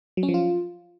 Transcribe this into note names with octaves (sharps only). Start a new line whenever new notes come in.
F#3
C#4
F3
F4